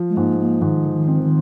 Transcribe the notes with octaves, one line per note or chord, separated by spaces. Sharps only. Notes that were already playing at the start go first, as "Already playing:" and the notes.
Already playing: F3
G#3
G#2 A#3
A#3
G#2 D#3
D3
D#3
C4
D#3